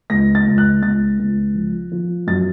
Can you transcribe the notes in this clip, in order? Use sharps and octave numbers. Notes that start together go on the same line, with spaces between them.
C#2 A#6
A6
C#2
F#6
C#2 A6
C#2
F3
F3
F#2 A6